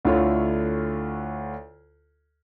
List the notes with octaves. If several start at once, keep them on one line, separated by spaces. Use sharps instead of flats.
D2 D3 E4 F4 C#5